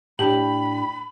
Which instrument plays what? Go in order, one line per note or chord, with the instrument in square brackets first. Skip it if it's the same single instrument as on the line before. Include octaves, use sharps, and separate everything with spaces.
[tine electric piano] A2 D4 [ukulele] G4 [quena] B5 [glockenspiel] F#7